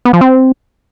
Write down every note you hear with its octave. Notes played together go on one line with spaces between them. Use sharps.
B3
F3
C4